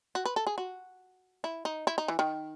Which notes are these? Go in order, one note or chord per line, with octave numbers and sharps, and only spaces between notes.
F#4
B4
A4
G#4
F#4
E4
D#4
E4
D#4
E3
D#3